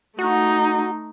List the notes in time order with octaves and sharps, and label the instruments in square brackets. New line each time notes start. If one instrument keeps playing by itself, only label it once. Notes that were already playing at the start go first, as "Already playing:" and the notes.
[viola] A3 D#4 [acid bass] F#4